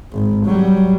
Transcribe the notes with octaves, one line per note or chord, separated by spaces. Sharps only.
G#1
F#3 G3